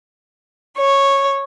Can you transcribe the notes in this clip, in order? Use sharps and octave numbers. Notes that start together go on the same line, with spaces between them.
C#5